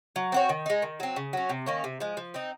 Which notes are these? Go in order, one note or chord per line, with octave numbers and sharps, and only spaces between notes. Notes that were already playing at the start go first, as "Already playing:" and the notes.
F#3
C4 F#4 C#5
D#3
G#3 D#4
D#3
F#3 C4
C#3
F#3 C#4
C3
D#3 A#3 C#4
C3
F3 G#3
F3
C4 D#4